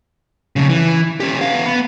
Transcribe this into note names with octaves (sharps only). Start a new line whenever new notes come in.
F2 C#3
E3
C#4 G4
B3 F5
B3